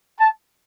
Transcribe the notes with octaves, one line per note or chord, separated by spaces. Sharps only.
A5